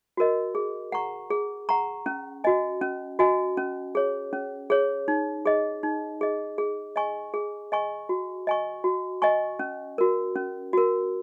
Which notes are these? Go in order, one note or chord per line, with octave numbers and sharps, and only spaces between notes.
F#4 A#4 D#5
G#4
F#5 A#5 C#6
G#4
F#5 A#5 C#6
C#4
F#4 D#5 G#5
C#4
F#4 D#5 G#5
C#4
G#4 C#5
C#4
G#4 C#5
D#4
G#4 D#5
D#4
G#4 D#5
G#4
D#5 G#5 C#6
G#4
D#5 G#5 C#6
F#4
D#5 G#5 C#6
F#4
D#5 G#5 C#6
C#4
F#4 A#4
C#4
F#4 A#4